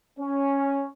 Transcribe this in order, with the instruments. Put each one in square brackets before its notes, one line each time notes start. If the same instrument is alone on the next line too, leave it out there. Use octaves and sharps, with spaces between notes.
[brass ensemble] C#4